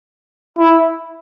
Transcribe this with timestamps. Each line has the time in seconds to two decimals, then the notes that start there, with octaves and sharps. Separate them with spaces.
0.59 E4